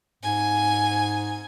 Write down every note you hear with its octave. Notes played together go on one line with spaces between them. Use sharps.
G#2 G#5